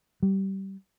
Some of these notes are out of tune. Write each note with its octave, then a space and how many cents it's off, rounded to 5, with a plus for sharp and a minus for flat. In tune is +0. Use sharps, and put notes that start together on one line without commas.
G3 -20